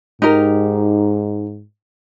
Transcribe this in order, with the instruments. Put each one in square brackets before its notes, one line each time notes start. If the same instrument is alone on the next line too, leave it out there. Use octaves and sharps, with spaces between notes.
[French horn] G#2 [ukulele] D#4 G4 A#4